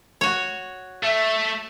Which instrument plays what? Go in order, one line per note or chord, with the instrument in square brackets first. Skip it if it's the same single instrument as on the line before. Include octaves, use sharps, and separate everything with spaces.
[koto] F#4 C#5
[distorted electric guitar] A3 [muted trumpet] E5